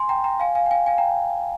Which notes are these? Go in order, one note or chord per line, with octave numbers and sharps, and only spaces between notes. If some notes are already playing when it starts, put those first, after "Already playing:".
Already playing: G#5 C6
G5 A#5
G5 A#5
F5 G#5
F5 G#5
G5
F5 G#5
F5 G#5
G5 A#5